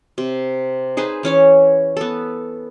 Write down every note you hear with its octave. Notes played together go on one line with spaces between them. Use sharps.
C3
D#4 G#4 B4 C5
E3 C#4 C#5 D6
B3 A4